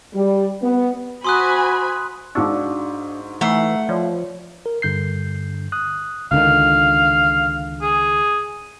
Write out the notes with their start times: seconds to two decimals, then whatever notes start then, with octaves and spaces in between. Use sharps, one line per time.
0.14 G3
0.62 B3
1.24 F#4 C5 G#5 B5 C6 D#6 F#6
2.35 G#2 D4 F#4 F5 C#6 D6 E6
3.41 E3 A3 F#5 A#5 E6 C7
3.89 F3 F4 C#5 D5
4.66 A#4
4.82 G2 D3 G6 C7
5.72 D#6 F#6
6.32 C#2 D3 D#3 F5
7.82 G#4